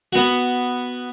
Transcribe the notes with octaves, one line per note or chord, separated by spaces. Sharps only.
B3 F#4